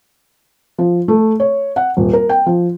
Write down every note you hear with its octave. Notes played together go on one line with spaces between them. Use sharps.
F3
A3
C#5
F#5
D#1
A#4
G5
F3